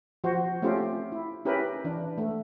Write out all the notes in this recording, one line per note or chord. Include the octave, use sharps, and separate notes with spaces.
F3 F#4 C5
A3 C4 C#4 F4 G4
E4
C#4 E4 G4 A#4 B4
E3 D4
A3